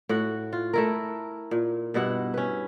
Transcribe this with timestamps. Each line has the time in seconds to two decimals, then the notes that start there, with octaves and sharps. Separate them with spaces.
0.09 A2 F#4 F#5
0.53 F4
0.73 A3 E4 A#4
1.51 A#2
1.94 G2 B2 E4 F#5
2.34 C#4 B4